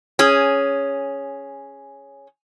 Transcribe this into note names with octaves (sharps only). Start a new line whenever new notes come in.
C#4 G#4